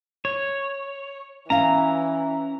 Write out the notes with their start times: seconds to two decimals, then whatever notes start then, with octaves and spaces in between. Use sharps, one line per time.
0.25 C#5
1.50 E3 C#4 F5 A#5